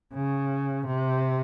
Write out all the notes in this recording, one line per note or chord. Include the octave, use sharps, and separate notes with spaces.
C#3
C3